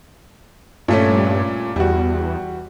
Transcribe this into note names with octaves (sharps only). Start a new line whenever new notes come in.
G2 A#2 A3 C#4
E2 G3 F#4